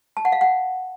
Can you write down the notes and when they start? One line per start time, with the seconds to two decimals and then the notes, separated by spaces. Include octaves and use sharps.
0.17 A5
0.25 F#5
0.32 F5
0.41 F#5